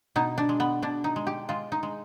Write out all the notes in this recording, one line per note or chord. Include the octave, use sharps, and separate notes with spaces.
B2 D#4
D4
G#3
B3
B2 D4
D#4
G#3
G4
G#3 F4
D#4
G#3